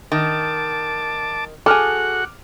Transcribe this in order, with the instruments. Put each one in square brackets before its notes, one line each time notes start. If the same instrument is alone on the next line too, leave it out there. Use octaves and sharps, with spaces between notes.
[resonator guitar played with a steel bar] D#3 [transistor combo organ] A5 D6
[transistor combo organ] F#4 F#5 [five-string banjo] G#4 A4 [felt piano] D6 F6